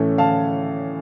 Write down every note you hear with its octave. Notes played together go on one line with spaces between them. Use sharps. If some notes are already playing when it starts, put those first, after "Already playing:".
Already playing: A2 E3 A3 C#4
F5 A5